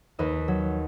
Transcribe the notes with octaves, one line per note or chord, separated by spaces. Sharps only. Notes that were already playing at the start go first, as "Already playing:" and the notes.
D#2 B4 D#5
F#3